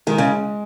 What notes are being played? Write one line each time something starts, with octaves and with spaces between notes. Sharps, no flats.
D#3 G#3
C#3